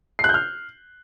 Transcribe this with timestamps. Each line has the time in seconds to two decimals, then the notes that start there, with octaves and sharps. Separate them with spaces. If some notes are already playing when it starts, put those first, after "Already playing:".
0.19 C7
0.24 F#6
0.29 G6
0.34 F6